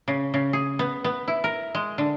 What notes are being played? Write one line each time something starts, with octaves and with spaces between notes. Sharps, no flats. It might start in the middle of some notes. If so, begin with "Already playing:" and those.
C#3
C#3
G#4
B3
B3
E4
A#4
G#3
D3